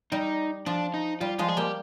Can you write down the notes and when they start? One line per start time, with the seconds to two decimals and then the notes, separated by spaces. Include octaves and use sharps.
0.12 G3 D#4
0.66 F3 D4
0.94 D#4
1.21 G3 F4
1.39 F3 G#3 F4
1.48 G#4
1.57 G3 A#3 G4